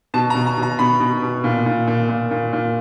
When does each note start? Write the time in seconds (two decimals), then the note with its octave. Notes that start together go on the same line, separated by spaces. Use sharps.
0.14 B2 A5
0.30 A#5
0.35 B2
0.46 A#5
0.57 B2
0.62 A#5
0.79 B2 B5
1.00 B2
1.22 B2
1.44 A#2
1.66 A#2
1.87 A#2
2.09 A#2
2.31 A#2
2.53 A#2